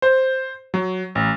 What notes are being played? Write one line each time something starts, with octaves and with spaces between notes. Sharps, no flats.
C5
F#3
A1